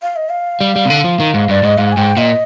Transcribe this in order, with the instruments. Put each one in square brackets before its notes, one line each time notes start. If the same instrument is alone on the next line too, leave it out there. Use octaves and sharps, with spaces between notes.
[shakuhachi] F5
D#5
F5
[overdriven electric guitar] G3
G3
C3
D3
F3
D#3
G#2
[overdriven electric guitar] G2 [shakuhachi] D5
[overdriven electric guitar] G#2 [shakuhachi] D#5
[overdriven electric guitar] G#2 [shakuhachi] F5
[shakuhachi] G#5
[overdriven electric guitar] G#2 [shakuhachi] G5
[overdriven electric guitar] A#2 [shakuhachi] D#5